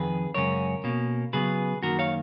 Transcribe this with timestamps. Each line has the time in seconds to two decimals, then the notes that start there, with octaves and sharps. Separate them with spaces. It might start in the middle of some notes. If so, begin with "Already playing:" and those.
Already playing: F2 D#3 G#4 B4
0.34 F#2 C#3 G#3 C#4 A#4 C#5
0.84 B2 A#3 C#4
1.33 C#3 F#3 B3 G#4 B4
1.83 F#2 D#3 A#3 F#4 A#4
1.99 C#5 F5